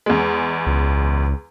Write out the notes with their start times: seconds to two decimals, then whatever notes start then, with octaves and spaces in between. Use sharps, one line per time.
0.06 E2 G#3
0.66 C#2